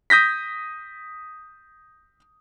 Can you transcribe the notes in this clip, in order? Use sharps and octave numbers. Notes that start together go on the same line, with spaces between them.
D#6 G6 A#6 B6